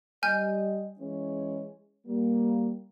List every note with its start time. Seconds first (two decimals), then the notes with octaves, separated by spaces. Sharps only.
0.23 G3 D#5 G#5 F6 G6
0.99 E3 G#3 C#4
2.06 G3 A#3